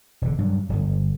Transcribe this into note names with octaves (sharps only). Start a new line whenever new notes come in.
E1 D3
G2 F#3
D1 G1